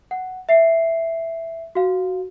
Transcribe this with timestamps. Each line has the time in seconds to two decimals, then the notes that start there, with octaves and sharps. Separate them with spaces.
0.11 F#5
0.49 E5 C7
1.75 F#4 F5